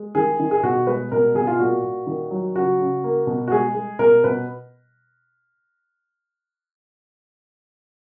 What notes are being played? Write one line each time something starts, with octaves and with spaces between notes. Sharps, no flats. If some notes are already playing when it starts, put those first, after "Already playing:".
Already playing: G#3
D#3 G#4
D#3
G#4
B2 F#4
G#3 B4
B2 A#4
B2 G#4
F4
A#2 F#4
A#2
D#3
F#3
C#3 F#4
C#3
A#3
B2
F#4
G#3 G#4
G#3
B2 A#4
B2 B4